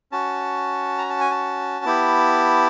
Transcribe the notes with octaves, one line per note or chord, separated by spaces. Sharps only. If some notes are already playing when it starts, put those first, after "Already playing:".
C#4 F#4 A5
A#5
A5
G#5
A5
B3 E4 G4